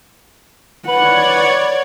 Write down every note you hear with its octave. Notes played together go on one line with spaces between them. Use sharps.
B4 C#5 D5 F#5 G#6